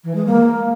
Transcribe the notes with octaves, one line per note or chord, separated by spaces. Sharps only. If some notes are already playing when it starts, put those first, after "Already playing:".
E3
G#3
A#3